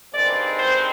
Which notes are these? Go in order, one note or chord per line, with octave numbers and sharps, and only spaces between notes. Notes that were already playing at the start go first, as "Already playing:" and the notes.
G2 D#3 G#3 C4 D5
C5